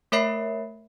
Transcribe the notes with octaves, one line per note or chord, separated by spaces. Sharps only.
A3 A#4 C#5 E5 B5 C7